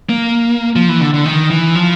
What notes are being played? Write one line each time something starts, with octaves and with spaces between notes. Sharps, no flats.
A#3
F3
E3
D3
D3
D#3
E3
F3